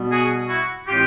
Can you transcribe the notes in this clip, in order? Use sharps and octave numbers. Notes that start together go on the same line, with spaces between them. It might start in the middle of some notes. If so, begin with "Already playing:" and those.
Already playing: B2 G3 B3
F#4 G#4
E4 F#4
A2 E3 G#3 C4 F4 G4